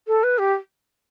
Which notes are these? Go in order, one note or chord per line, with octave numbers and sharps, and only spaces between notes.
A4
B4
G4